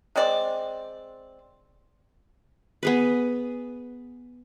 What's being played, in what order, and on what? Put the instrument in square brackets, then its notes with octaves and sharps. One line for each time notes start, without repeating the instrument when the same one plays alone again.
[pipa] G#3 C4 D5
[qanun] B3 G#4 B4